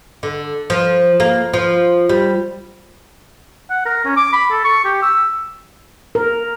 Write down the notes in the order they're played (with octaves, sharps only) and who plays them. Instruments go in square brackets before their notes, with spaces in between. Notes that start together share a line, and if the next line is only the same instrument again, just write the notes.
[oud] D3
F3
A#3
F3
G3
[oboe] F#5
A#4
C#4
D6
B5
A4
C#6
G4
E6
[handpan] A#4